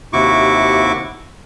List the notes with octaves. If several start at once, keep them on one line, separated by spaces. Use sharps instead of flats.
D#2 C3 E4 F#4 C#6 D6